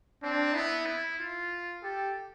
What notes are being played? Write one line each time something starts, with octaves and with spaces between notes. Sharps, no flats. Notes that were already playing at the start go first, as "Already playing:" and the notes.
C4 D4
B3 E4
E4
F4
G4 A4